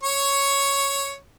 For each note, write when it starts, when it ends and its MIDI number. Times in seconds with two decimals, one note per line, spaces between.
0.03 1.15 73
0.03 1.15 85